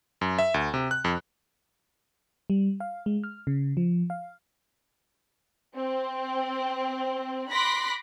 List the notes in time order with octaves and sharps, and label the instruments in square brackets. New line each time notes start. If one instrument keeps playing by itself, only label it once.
[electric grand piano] F#2
E5
D2
C3
F#6
F2
[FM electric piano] G3
F5
G#3
F6
C#3
F3
F5
[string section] C4
B5 C6 D6 F#6 A#6 B6